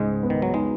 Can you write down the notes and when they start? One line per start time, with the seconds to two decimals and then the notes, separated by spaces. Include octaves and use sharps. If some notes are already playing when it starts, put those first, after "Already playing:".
Already playing: C#2 G#2 C#3 G#3
0.23 B3
0.30 D#3
0.42 F#3
0.54 G#3 D#4